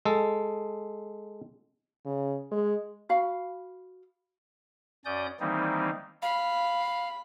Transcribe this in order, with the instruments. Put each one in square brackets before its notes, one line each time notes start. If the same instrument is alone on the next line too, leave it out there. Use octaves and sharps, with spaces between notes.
[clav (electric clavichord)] G#3 A4
[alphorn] C#3
G#3
[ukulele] F#4 F5 B5
[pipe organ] F#2 C#4 D5 D#6 G6
D#3 E3 G3 A#3 C4 D#4
[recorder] F5 [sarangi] B5